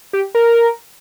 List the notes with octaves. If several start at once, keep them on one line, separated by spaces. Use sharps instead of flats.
G4
A#4